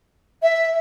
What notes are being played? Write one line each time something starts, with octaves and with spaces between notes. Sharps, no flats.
E5